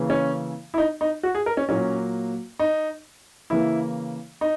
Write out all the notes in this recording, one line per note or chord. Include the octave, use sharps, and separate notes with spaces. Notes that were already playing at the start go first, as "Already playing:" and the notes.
Already playing: C#3 E3 A#3
C#4
E4
D#4
D#4
F#4
G#4
A#4
C#4
A#2 F#3 A#3 C#4
D#4
C#3 E3 A#3 E4
D#4